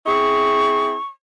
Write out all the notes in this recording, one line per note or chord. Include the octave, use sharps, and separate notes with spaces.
C4 E4 G#4 C#6